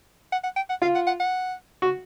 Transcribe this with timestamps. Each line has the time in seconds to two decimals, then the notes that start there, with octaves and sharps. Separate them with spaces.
0.32 F#5
0.44 F#5
0.56 G5
0.69 F#5
0.82 F4 F5
0.95 F#5
1.07 F#5
1.20 F#5
1.82 F#4